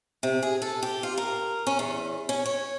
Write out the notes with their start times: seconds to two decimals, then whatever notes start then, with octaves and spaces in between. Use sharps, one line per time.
0.23 C3
0.43 G#4
0.62 A4
0.82 G4
1.03 F4
1.18 A#4
1.67 C#4
1.79 E2
2.29 C#4
2.46 C#5